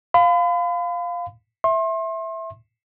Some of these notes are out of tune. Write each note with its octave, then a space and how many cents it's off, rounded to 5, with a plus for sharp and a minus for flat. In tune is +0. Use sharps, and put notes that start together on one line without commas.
F5 +5 B5 +40
E5 -5 C6 +35